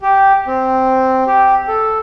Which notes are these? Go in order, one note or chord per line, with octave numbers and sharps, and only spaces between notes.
G4
C4
G4
A4